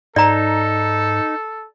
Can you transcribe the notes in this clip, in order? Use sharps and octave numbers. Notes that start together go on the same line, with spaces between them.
G#2 D#4 A4 D5 A#5